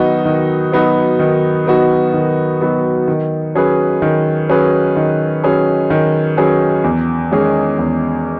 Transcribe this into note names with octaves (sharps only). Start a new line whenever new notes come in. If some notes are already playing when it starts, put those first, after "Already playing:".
Already playing: D#3 F#3 B3 D#4 F#4
D#3
F#3 B3 D#4 F#4
D#3
F#3 B3 D#4 F#4
D#3
F#3 B3 D#4 F#4
D#3
F#3 C#4 G#4 B4
D#3
F#3 C#4 G#4 B4
D#3
F#3 C#4 G#4 B4
D#3
F#3 C#4 G#4 B4
E2
D#3 G#3 C#4 G#4
E2